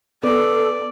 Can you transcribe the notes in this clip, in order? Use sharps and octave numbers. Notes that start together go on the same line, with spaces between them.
B3 A4 D5